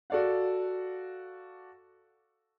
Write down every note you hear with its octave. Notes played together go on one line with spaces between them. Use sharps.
F#4 A4 D5 F5 F#5